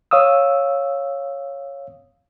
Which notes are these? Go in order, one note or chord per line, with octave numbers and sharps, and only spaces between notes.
C#5 F5 D#6 E6